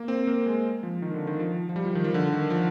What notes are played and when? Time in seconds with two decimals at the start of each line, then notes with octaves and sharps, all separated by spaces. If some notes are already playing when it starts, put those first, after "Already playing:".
Already playing: A#3
0.08 C4
0.27 A#3
0.46 G#3
0.83 F3
1.02 D#3
1.14 D3
1.27 D#3
1.39 F3
1.69 F3
1.76 G3
1.85 F3
1.95 D#3
2.04 F3
2.14 D3
2.32 D#3
2.50 F3